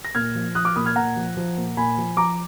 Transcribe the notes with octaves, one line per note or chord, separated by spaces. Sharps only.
A#6
A#2 F6 G#6
F3
F3 D#6 F#6
D6 F6
A#2 B5 D#6
F6 G#6
A#2 F#5 A#5
F3
F3
A#2
A#2 G#5 B5
F3
F3 A#5 D6